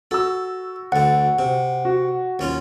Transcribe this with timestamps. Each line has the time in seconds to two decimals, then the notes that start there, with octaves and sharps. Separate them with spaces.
0.11 F#4 A4 E6
0.92 D2 D3 F#5
1.39 C3
1.85 F#4
2.39 D#2 C#4 F4